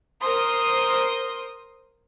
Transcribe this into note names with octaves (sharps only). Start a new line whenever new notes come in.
A#4 C5 C6 D#6